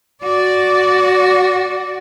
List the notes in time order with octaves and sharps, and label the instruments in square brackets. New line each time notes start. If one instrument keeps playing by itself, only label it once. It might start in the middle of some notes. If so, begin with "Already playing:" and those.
[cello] F#4 D5